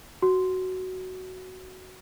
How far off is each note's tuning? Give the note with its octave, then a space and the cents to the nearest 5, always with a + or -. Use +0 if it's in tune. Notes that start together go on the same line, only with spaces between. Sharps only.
F#4 +5